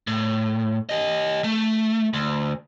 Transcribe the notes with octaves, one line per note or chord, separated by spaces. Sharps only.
A2
G4 D#5
A3
D2